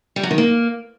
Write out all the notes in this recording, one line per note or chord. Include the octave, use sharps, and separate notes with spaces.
G3
F#3
D#3
A#3